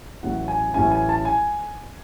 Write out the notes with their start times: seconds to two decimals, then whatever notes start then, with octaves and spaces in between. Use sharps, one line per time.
0.23 A1 A2 F#3 C#4 E4 F#5
0.48 G#5
0.74 A1 A2 F#3 C#4 E4 G#5
0.91 G#5
1.09 A5
1.25 G#5